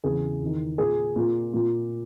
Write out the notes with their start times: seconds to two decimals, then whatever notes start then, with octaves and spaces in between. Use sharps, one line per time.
0.04 E2 C#3 E3 G#4
0.41 E2 D#3
0.78 A#2 G#4
1.16 A#2
1.54 A#2